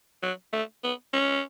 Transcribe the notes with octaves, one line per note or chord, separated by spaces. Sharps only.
F#3
A3
B3
C#4